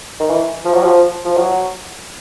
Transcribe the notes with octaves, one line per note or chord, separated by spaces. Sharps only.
D#3
E3
F3
F#3
F3
F3
F#3